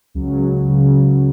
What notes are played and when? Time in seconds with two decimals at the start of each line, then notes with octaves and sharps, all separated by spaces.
0.14 C#2 C#3 F#3
0.68 C#2 C#3 F#3